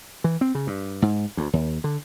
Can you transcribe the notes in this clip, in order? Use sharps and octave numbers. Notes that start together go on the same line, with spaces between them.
E3
C4
C#3
G2
G#2
D2
D#2
D3